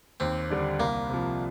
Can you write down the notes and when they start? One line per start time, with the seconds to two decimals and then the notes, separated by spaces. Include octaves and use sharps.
0.20 D#2 C4
0.50 D3 G3 D4
0.79 C2 A#3
1.10 C3 F3